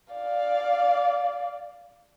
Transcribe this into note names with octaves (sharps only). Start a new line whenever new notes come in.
D5 F5